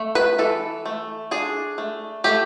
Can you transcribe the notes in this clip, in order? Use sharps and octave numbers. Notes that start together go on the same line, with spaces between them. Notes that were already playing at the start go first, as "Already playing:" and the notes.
Already playing: A3
B4
E3 A4
A3
D4 G#4
A3
A3 G4